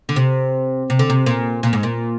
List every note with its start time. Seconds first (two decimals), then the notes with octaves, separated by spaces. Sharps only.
0.09 D3
0.16 C3
0.90 C3
0.99 D3
1.10 C3
1.26 A#2
1.63 A#2
1.73 G#2
1.83 A#2